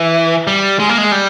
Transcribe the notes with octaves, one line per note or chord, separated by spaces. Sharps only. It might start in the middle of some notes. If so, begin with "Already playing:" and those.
Already playing: E3
G3
G#3
A#3
G#3
G3